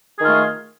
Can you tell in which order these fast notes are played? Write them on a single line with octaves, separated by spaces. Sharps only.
G#4 D#3 F4 A3